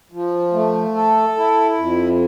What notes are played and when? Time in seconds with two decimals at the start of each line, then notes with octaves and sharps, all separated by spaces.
0.12 F3
0.53 A3
0.95 A4
1.37 E4
1.78 F2